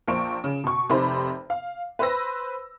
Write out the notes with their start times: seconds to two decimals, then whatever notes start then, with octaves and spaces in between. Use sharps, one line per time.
0.08 A#1 A#3 C5 C#6 D7
0.44 C#3
0.64 B2 C#6
0.89 F1 C3 D#4 G4 C5 B5
1.50 F5
1.99 B4 C5 B5 E6 A#6